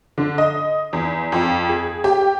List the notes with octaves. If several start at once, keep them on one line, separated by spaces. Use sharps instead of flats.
D3
D#5
E2
F2
G#4
G4